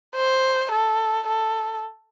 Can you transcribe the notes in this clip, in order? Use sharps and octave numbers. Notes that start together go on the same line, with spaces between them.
C5
A4
A4